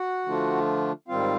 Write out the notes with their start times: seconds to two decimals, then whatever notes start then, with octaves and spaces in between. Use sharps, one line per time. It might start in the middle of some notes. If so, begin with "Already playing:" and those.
Already playing: F#4 F#5
0.26 D3 F3 A3 D4 F4
1.08 G#2 D#3 G3 C4 F4 F5